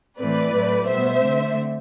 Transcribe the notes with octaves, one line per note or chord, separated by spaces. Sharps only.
A2 E3 A3 C4 B4 D5
A2 F#3 A3 C4
B2 G3 B3 C5 E5
D3 A3 C4